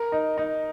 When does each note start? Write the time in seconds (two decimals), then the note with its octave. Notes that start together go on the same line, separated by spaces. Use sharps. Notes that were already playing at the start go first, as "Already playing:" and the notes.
Already playing: A#4
0.12 D#4
0.38 D#4